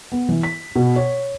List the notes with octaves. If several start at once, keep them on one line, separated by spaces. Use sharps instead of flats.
B3
E3
B6
B2
C#5